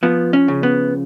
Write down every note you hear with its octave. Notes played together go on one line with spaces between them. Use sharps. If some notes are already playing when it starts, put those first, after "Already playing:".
F3 B3
C#4
C#3
B3